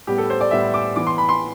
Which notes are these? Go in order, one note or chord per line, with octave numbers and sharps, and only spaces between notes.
A2 G3 B3 G4
A4
C5
D5
A2 G3 B3 E5
D6
E3 B3 D6
C6
B5
C6